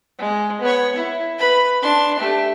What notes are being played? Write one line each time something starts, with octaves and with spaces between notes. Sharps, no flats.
G#3
B3 C#5
E4
B4 B5
D4 C6
A3 G4